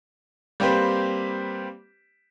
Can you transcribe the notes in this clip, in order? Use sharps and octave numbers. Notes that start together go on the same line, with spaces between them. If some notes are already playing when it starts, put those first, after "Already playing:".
G3 A#3 C4 G4 B4 C5